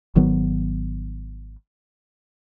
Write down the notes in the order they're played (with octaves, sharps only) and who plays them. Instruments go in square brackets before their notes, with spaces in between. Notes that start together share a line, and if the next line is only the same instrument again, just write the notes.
[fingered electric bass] G#1 D#3 F#3 B3